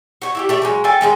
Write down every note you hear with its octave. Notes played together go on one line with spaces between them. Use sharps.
F#4 C#5
E4 F#4 G4
A3 G4 E5
F3 F#3 G#3
A4 F5 G5 G#5
D#3 E3 G#3 C#4